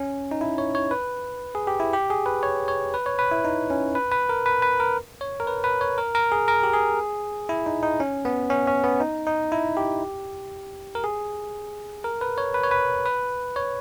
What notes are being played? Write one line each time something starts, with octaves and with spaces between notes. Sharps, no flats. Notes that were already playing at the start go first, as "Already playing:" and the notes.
Already playing: C#4
D#4
E4
C#5
C#5
B4
G#4
G4
E4
G4
G#4
B4
C#5
C#5
B4
C#5
B4
E4
D#4
C#4
B4
B4
A#4
B4
B4
A#4
C#5
A#4
B4
B4
C#5
A#4
A#4
G#4
A#4
G4
G#4
E4
D#4
D#4
C#4
B3
C#4
C#4
B3
D#4
D#4
E4
G4
A#4
G#4
A#4
B4
C#5
B4
C#5
B4
B4
C#5